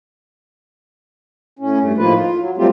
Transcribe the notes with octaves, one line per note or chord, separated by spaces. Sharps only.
A2 C#4
G2 A3
A2 D#3 F3 A#3 F4 B4
F4
F#3
F#3 G3 A3 C4 F4 G4